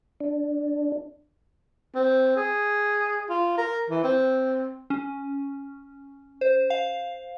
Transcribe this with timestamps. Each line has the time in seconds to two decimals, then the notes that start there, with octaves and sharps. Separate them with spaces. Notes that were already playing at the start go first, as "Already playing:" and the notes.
0.20 D4
1.95 C4
2.37 G#4
3.30 F4
3.58 A#4
3.90 E3
4.04 C4
4.90 C#4
6.41 C5
6.70 F5